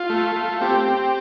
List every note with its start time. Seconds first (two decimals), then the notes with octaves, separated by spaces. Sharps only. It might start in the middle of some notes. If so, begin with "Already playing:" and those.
Already playing: F4
0.09 A3
0.36 A3
0.61 C4 G4
0.88 C4